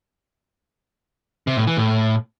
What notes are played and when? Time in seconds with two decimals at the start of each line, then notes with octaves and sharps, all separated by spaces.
1.47 C3
1.57 A2
1.67 E3
1.77 A2